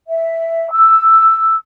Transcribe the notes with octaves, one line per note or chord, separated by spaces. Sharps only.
E5
E6